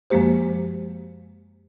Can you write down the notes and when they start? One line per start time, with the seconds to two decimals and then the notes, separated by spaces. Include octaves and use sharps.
0.10 F#2 F3 G#3 A#3 G4 C5